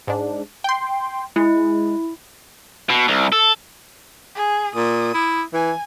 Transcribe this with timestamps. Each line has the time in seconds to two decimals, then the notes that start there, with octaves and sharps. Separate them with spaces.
0.07 G#2 D4
0.64 G5 C6
1.36 G#3 E4
2.90 B2
3.08 C2
3.32 A4
4.35 G#4
4.75 A#2 D#6
5.14 E4
5.53 E3 G#5